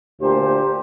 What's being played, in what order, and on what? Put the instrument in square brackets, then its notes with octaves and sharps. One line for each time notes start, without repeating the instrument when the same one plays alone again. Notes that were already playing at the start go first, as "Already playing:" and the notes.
[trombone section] D2 A#2 C5 [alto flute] G4